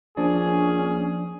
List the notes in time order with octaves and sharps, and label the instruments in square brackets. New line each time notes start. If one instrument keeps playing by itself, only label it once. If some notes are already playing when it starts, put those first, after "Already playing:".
[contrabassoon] A#1 [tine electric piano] F3 D4 D5 [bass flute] C#4 [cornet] G#4